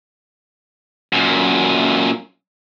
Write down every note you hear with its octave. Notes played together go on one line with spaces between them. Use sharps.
F#2 A#2